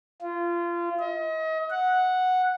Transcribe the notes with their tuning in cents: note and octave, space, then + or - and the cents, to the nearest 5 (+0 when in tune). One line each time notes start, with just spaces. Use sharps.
F4 -25
D#5 +35
F#5 -5